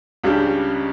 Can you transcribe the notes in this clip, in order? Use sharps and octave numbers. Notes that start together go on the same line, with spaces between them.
C#2 C#3 G3 D4 G4